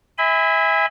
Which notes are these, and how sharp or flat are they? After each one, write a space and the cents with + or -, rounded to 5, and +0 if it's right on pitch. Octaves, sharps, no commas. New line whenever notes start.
E5 -25 G#5 -25 B5 +25